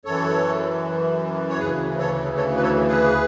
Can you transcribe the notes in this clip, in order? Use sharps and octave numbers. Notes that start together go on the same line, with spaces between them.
F#2 E3 A4 C#5
C#5
D2 C#3 E3 G#4 B4
A4 C#5
A4 C#5
B4
A4 C#5
G#4 B4